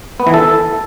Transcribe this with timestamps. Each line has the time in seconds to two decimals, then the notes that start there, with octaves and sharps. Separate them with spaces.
0.20 B3
0.27 E3
0.34 A4